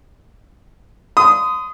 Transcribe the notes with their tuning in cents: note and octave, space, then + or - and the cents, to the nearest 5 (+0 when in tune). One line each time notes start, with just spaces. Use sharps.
C6 -40 D#6 +0